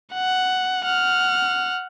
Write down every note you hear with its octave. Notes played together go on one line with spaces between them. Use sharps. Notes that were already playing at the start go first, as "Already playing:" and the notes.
F#5
F#5 F6